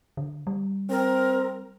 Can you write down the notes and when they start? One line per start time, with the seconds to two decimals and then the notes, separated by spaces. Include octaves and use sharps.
0.17 D3
0.47 G3
0.90 C4 A#4